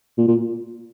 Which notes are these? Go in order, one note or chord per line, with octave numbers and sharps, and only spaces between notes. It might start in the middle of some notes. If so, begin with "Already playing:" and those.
A#2
A#2